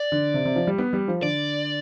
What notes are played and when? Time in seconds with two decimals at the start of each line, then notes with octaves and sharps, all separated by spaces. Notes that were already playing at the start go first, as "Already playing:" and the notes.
Already playing: D5
0.12 D3
0.34 C3
0.45 C3
0.56 F3
0.67 G3
0.78 B3
0.93 G3
1.08 F3
1.23 D3 D5